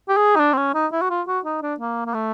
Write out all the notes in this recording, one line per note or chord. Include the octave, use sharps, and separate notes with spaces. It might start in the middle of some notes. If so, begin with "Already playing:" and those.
G4
G#4
D#4
D4
C4
C#4
D#4
E4
F#4
F4
F#4
D#4
D4
A#3
A#3
A3